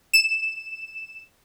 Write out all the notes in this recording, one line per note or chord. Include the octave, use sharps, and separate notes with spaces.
E7